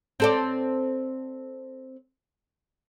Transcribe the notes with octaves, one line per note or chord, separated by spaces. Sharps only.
C4 A4 D5